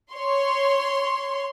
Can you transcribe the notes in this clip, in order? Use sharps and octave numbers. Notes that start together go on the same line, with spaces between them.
C#5 C6